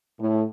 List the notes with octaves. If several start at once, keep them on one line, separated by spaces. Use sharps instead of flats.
A2